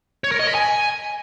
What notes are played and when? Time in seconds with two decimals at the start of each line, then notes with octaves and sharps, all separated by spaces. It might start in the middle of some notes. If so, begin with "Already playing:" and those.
0.24 C#5
0.32 A#4
0.39 D#5
0.47 B5
0.55 G#5